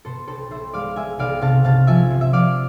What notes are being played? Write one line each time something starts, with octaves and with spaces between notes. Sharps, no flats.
B2 A4 C5
B1 A4 C5
B1 C5 E5
G#3 D5 F5
G#3 E5 G#5
B1 D5 F5
C3 F5 A5
C3 F5 A5
F3 E5 G#5
C3
E5
F3 D5 F5